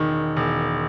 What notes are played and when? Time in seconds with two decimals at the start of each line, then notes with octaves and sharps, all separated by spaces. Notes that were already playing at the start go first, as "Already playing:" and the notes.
Already playing: E1 D#3
0.37 E1